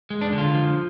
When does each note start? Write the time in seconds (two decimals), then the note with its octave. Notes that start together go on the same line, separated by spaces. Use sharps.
0.10 G#3
0.21 D4
0.33 D3
0.38 F4
0.55 F3